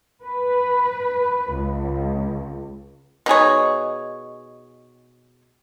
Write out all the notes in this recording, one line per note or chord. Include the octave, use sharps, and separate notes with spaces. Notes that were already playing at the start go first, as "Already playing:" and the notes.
B4
C#2
B2 D#4 G#4 C#5